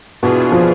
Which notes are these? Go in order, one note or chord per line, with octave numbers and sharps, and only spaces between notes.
B2 E3 B3 D4 F4 G#4
F3